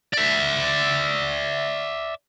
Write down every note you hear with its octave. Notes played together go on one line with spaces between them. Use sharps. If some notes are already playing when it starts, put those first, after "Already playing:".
D5 E5